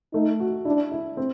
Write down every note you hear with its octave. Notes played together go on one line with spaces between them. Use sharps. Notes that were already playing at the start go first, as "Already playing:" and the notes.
A3 D#4
F#4
D4 E4
E4
C4